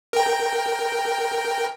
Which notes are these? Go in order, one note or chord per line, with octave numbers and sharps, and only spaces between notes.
A#4 G5